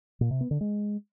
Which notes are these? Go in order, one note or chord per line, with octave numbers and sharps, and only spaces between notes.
A#2
C3
B3
D3
G#3